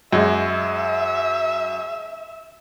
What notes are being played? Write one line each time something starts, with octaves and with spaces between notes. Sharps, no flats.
F#2 G#3 E5